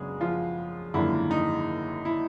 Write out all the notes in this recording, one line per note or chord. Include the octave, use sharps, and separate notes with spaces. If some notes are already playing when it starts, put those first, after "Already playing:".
Already playing: F#2 C#3 F#3 G#3 B3 D4 G#4
F3 F4
G#1 F#2 D3 F3 A#3 E4
D#4
E4